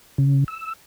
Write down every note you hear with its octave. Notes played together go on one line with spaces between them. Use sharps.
C#3
E6